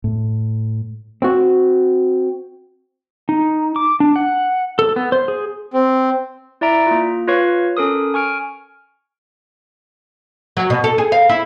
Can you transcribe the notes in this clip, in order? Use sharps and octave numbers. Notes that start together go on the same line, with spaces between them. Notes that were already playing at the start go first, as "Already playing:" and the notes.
A2
C4 F#4
D#4
D6
D4
F#5
A4
B3
C5
G#4
C4
E4 D5 E5 A#5 D7
A#3 F4
F4 B4 C#5 F5 C#6
C#4 A4 A#4 D#6
G#5 C#6 F6 D7
F#3
B2
A4
G#4
F5
E4